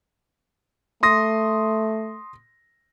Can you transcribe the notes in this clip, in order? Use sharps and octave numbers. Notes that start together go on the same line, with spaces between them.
A3 C6 D#6 A#6